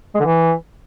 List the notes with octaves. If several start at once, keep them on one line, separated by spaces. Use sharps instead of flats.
G#3
D3
E3